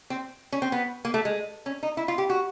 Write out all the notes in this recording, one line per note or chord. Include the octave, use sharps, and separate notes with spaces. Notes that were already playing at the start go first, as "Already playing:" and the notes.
C4
C#4
C4
B3
A#3
A3
G#3
C#4
D#4
E4
F4
G4
F#4